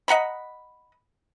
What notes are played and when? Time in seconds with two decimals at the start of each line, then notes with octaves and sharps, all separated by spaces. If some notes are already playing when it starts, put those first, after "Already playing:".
0.08 D#5 F#5 A#5 B5